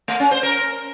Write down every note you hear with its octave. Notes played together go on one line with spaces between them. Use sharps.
A3
C#4
C5
A#4